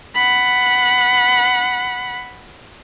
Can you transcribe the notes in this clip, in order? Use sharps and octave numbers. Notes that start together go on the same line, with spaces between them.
F#5 B5